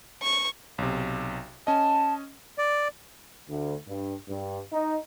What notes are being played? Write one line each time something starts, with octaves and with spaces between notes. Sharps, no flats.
C#6
B1 C3
C#4 D#5 A5
D5
D2
G2
G2
D#4